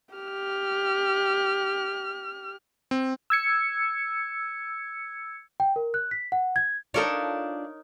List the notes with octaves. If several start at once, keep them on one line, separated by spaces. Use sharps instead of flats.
G4 F6
C4
E6 G#6 C#7
G5
A#4
F#6
B6
F#5
G#6
D4 D#4 F4 A4 A#4 C#5